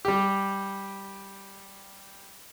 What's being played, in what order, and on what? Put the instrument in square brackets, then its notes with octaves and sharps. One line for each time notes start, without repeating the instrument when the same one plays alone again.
[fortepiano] G3 G4